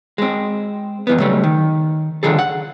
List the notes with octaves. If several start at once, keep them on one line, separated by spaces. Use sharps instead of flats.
G#3 C4
F2 E3 B3
C#3 F#3 G3 A3
D#3
D3 D#3 F3 G#4 A4
F#5